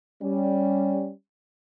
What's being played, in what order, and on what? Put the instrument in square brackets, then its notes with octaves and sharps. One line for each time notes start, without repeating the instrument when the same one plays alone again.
[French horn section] G3 C#4